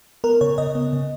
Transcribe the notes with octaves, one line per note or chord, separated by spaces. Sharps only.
B3 A#4
C#3 C#5
C#3 D#5
B3
C#3